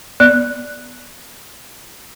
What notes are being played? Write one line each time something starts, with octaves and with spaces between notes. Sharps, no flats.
B3 D5 F#6